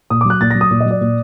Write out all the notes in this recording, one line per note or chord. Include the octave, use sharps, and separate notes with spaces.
A#2 D#6
D6
F#3
F#6
A#2 A6
A#6
F#3
D#6
A#2
D#5
F#3
D5
A#2